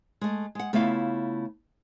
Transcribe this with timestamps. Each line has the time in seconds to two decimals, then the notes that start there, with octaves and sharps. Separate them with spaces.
0.21 G#3 A3
0.55 G#3 F#5
0.73 C#3 A3 B3 E4 F4 F5